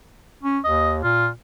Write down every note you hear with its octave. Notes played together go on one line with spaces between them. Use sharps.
C#4
D#2 D#5
A#2 F4